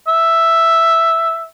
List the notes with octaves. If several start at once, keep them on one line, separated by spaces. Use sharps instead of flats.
E5